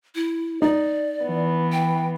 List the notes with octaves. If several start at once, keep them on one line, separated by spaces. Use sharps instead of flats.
E4
D#4 D5
E3 B3
G5